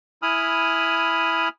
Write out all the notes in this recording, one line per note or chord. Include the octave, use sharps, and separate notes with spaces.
E4 G#5 B5 D#6 F6